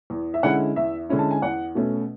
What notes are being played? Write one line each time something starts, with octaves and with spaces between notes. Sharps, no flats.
E2
E5
D3 G#3 C#4 E4 F#5
E2 E5
D3 G#3 C#4 E4
A5
G#5
E2 F#5
B2 A3 C#4